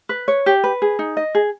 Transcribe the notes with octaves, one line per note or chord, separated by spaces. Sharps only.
B4
C#5
G4
B4
G#4
D#4
D#5
G#4